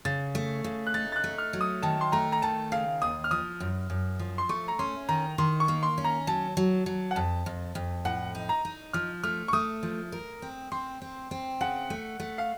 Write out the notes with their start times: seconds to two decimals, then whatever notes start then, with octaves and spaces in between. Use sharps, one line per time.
0.05 C#3 A6
0.35 A3
0.64 C#3
0.87 F#6
0.94 D#4 A6
1.12 A6
1.16 F#6
1.24 A3
1.38 F6
1.53 F#3
1.61 D#6
1.82 D#3 A5
2.01 C6
2.12 A3 A#5
2.32 A#5
2.42 D#3 A5
2.72 C#3 F5
3.02 D#2 D#6
3.24 F6
3.31 F3 D#6
3.60 F#2
3.90 F#2
4.19 F3
4.38 C6
4.49 A3 C#6
4.68 A#5
4.79 C#4 C6
5.09 D#3 A#5
5.38 D#3 C6
5.60 C#6
5.68 A#3
5.83 C6
5.98 C#4
6.04 A#5
6.27 F#3 A5
6.57 F#3
6.86 F#3
7.11 F#5
7.16 F2 A5
7.46 F2
7.75 F2
8.05 A2 F#5
8.35 D#4
8.49 A#5
8.65 D#4
8.93 F3 F6
9.23 A3 F6
9.48 C#6
9.53 A3 D#6
9.83 F3
10.12 A#4
10.42 C4
10.72 C4 C6
11.02 C4
11.31 C4
11.61 C#3 F#5
11.90 A3
12.20 A3
12.38 F5